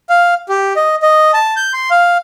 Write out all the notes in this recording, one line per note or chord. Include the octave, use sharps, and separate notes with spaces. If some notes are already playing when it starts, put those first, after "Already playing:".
F5
G4
D#5
D#5
A5
G6
C6
F5